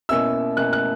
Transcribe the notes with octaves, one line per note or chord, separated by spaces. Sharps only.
B2 A#3 C#4 E4 E6
B2 A#3 C#4 E4 F#6
F#6